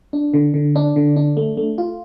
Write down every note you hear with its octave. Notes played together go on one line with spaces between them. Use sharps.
D4
D3
D3
D4
D3
D4
A3
A3
F4